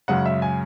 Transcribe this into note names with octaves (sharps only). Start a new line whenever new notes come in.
F#2 C#3 G#3 F#5
E5
G#5